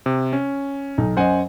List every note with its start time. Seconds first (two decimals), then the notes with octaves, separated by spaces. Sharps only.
0.06 C3
0.33 C#4
0.98 B1 D#4
1.17 F#2 C5 D#5 F#5 G#5